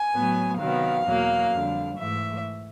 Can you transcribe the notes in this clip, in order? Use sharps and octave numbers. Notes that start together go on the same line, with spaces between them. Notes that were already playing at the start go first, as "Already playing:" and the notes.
Already playing: G#5
A2 F#3 B3
C3 D#3 F#3 B3 F5
E2 B2 F#3 A#3
F2 D3 G3
G#2 E3 A3 E5